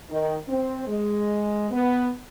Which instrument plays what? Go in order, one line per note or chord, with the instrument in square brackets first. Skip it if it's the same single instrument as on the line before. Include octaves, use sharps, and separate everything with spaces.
[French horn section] D#3
C4
G#3
B3